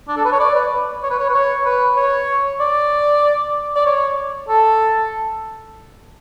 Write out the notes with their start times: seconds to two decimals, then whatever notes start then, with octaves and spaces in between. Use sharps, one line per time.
0.08 D4
0.17 A4
0.25 B4
0.32 C#5
0.40 D5
0.55 B4
1.03 C#5
1.10 B4
1.19 C#5
1.30 B4
1.34 C#5
1.65 B4
1.97 C#5
2.60 D5
3.76 D5
3.86 C#5
4.49 A4